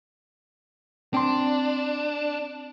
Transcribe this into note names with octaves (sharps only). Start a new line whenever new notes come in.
C4 D4 C6